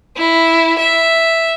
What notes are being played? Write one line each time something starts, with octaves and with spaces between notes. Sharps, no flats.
E4
E5